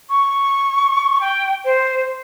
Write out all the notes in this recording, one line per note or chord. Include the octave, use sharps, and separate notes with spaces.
C#6
G5
C5